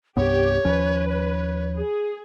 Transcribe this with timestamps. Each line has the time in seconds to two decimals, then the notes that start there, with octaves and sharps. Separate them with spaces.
0.17 C2 G2 B3 G4 C#5
0.65 D#2 F3 C#4 B4
1.09 C#5
1.76 G#4